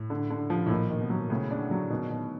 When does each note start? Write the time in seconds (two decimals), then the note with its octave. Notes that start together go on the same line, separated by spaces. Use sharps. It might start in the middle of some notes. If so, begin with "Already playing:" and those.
Already playing: A2
0.10 D3
0.30 D3
0.50 F3
0.66 A2
0.70 A#2 D#3
0.90 D#3
1.01 B2
1.10 F#3
1.30 A2 C#3
1.51 D4
1.60 D3
1.71 F#3
1.90 B2 D#3
2.10 B2